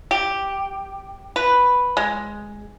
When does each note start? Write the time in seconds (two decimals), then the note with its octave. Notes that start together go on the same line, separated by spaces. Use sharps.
0.11 G4
1.36 B4
1.97 G#3